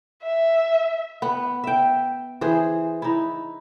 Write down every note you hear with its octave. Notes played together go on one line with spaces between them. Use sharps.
E5
B3
E5 G5
E3 G#4 C5
D#4 E4